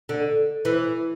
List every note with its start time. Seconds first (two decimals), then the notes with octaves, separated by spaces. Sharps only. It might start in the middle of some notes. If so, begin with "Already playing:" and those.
0.09 D3
0.65 E3